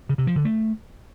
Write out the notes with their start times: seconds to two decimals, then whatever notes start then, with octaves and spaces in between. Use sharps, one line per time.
0.09 C#3
0.18 C3
0.27 F3
0.36 D3
0.45 A3